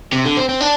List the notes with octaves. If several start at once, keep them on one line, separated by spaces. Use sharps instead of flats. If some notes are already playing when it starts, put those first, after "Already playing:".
C3
D3
C4
C4
D4